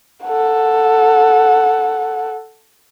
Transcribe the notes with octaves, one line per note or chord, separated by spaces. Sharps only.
A4 F#5